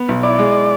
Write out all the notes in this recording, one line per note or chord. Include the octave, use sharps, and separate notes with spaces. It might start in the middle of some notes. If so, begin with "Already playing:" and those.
Already playing: B3
B1
E4 D5
G#3